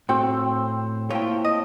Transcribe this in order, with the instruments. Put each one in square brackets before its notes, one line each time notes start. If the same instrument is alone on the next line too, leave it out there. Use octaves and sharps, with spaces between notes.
[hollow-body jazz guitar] A2 F#4 G5 [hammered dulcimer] C4
[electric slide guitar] A#3 E4 A5 [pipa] F4 [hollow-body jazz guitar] C#5 G5
[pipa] D#5